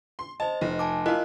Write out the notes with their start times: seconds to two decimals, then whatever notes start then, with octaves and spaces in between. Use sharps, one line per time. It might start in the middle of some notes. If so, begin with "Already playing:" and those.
0.19 C6
0.40 C5 D#5 A5
0.61 F1
0.79 G#5 A5 D6
1.06 E4 F4 A#4 D#5 F#6